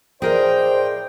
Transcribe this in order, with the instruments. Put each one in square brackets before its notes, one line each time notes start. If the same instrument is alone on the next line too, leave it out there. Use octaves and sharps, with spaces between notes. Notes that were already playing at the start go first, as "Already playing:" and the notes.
[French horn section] A2 D5 [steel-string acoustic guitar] G#4 A#4 D#5 [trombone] C5 [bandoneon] G5